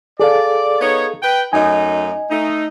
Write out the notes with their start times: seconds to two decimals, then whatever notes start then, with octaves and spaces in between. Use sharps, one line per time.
0.20 G#4 A4 D5 F5
0.81 B3 D#4 C#5
1.22 B4 G5
1.53 F#2 A3 D#4 D#5 G#5
2.31 A3 D#4